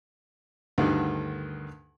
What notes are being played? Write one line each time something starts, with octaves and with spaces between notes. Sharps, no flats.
D2 G2 D3 D#3